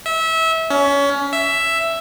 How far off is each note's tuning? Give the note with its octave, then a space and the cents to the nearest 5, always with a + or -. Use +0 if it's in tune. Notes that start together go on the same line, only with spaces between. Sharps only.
E5 -25
C#4 +25
E5 +5